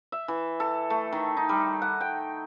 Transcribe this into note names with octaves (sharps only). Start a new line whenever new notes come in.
E5
E3
A4
A3
D#3
D#4
G3
F#5
G5